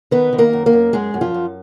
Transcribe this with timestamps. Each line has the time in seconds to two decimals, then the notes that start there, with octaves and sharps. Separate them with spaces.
0.11 D#3 B3 B4
0.33 D#3
0.38 A#3 A#4
0.53 F#2
0.66 A#3 A#4
0.73 F#2
0.93 F#2 G#3 G#4
1.14 F#2
1.21 F3 F4
1.34 F#2